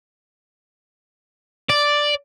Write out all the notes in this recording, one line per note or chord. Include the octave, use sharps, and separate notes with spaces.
D5